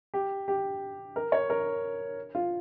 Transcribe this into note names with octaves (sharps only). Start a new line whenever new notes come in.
G4
G4
A#4
C#5
A#4
F4